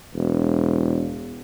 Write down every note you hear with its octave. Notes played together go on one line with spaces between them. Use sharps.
E1